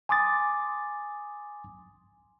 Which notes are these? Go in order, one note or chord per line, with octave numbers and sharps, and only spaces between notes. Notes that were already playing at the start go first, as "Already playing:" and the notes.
G#5 C6 D6 D#6 A6